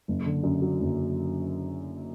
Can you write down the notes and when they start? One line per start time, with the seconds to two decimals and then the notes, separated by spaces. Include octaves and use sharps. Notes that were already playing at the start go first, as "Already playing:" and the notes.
0.08 F#1
0.26 D3
0.43 F#2
0.62 F#3
0.80 F#1